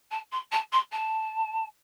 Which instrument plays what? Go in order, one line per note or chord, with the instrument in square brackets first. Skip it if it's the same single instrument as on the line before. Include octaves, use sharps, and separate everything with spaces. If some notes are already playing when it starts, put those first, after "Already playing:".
[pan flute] A5
C6
A5
C6
A5